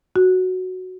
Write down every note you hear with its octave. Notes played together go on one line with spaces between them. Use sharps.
F#4